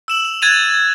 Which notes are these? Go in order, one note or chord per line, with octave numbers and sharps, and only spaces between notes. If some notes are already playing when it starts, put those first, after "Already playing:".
E6 E7 F#7
F7
F#6 G#6 A6 D#7 F7